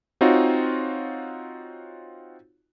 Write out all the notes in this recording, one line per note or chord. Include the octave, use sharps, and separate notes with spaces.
C4 D#4 F4 F#4 C#5